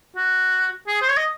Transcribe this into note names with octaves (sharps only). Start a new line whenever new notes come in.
F#4
G#4
C5
C#5
D#5